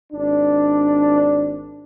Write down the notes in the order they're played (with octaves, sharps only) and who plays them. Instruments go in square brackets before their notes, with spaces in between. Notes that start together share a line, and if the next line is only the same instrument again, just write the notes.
[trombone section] G#1 D4